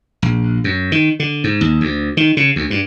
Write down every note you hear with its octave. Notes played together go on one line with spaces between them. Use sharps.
A#1
F#2
D#3
D3
G#2
D#2
D2
D#3
C#3
D2
G2